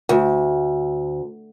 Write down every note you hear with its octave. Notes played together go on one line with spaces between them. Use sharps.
D2